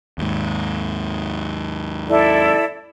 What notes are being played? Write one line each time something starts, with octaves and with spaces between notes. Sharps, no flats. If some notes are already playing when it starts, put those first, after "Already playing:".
D#2 G#2
E4 A4 D5